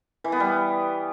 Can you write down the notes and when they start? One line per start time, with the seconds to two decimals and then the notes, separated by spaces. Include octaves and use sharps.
0.24 E3
0.32 B3
0.40 G3